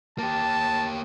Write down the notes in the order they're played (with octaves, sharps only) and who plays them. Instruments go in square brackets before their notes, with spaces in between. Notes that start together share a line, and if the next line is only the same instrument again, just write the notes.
[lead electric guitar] A#3 G4 [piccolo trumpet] A5